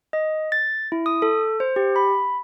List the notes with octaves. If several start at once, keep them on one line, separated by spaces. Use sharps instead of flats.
D#5
A6
E4
D#6
A4
C5
G4
B5